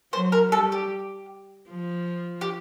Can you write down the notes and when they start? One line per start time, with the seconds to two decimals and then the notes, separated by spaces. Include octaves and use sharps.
0.13 F#3 C5
0.32 A#4
0.52 G3 A4
0.72 G4
1.70 F3
2.41 G4